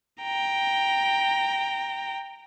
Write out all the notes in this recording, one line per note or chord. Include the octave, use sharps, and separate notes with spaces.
G5 A#5